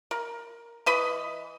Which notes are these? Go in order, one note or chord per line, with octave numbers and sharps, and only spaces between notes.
A#4
E3 B4 D#5 B5